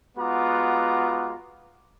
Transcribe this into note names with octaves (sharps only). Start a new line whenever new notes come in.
G#3 B3 F4 F#4 A#5 D6